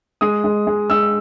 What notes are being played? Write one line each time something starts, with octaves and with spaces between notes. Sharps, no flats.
G#3 D#6
G#3
G#3
G#3 E6